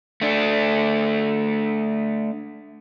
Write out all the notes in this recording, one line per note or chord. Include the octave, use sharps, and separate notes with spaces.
A3 D4